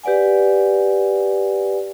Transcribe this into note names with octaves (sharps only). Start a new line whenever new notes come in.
G4 B4 D5 F#5 G#5